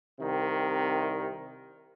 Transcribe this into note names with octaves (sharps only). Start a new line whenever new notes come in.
C2 C3 D#3